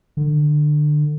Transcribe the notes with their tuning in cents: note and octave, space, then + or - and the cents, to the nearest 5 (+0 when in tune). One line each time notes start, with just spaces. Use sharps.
D3 +25